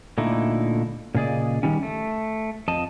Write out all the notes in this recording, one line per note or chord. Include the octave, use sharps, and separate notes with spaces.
A#2 D3 A3 D#4 E4
A#2 C#3 G#4 D5 D#5
D#3 G3 C#4
A3
F2 D#5 A5